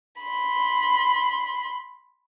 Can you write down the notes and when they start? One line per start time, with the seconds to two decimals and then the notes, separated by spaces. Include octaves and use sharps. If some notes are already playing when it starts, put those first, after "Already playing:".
0.22 B5 C6